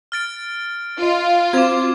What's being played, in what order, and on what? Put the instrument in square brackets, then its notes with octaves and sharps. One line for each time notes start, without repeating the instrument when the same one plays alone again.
[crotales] F6 A6 D7
[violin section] F4 [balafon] D#5
[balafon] C4 F#4 C5 [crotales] D6 G#6